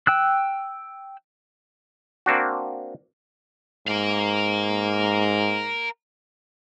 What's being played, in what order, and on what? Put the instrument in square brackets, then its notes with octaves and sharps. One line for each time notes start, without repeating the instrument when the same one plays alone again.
[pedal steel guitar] G5 E6 F#6
[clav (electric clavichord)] A#3 C4 D4 F#4
[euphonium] G#2 [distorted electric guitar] A#4 F5